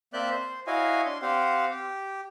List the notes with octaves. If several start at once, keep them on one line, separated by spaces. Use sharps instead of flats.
A#3 C4 D5 E5 F#6 G6
C5
E4 F#4 C#5 D#5 F5 G#5
D4 C6
C4 G4 C5 F5 F#5
G4